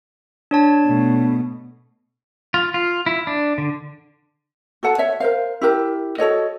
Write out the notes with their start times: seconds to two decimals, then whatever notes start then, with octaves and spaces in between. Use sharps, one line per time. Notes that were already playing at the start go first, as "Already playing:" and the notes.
0.51 D4 C#5 A5
0.87 B2 A3
2.54 F4
2.74 F4
3.06 E4
3.27 D4
3.58 D3
4.83 F#4 A4 F#5 A5
4.98 C#5 E5
5.20 A#4 C5 F5
5.61 E4 G4 A#4
6.18 F#4 A4 C#5 D#5